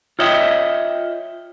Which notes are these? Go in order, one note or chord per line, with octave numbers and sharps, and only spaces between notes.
F4 C#5 D#5 E5 G5